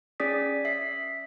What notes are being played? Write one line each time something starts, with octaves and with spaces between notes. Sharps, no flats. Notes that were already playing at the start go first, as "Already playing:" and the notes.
C#4 G#4 D5 D#6 B6
E5 B6 C7